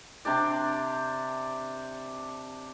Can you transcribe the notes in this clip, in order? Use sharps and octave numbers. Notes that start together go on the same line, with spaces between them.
C3 D4 G4 D5